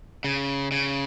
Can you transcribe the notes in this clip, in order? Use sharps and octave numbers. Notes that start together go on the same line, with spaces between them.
C#3
C#3